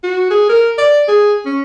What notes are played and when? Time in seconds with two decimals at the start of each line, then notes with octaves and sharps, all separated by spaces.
0.04 F#4
0.31 G#4
0.49 A#4
0.78 D5
1.08 G#4
1.46 C#4